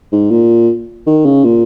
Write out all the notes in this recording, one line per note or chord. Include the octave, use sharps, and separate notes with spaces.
G#2
A#2
D#3
C#3
A#2